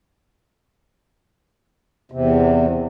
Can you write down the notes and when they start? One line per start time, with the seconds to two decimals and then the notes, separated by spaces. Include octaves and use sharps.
2.12 E2 C3